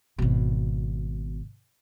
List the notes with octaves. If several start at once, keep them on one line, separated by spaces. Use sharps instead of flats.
G#1 B2